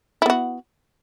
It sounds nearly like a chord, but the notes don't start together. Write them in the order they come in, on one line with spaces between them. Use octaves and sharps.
E4 B3 F#4